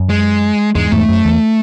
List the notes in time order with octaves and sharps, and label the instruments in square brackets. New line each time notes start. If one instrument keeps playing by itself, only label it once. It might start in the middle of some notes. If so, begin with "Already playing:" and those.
Already playing: [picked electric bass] F#2
[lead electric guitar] G#3
[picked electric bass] E2 G#2 [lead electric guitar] G#3
[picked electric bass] E2 G#2 [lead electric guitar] A3
[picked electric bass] F#2
E2